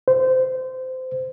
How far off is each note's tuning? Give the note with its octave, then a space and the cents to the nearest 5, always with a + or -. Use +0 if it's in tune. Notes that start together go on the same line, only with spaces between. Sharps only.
C5 -20